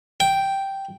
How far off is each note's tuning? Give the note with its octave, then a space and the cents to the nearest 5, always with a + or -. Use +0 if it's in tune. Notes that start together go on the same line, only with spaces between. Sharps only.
G5 -5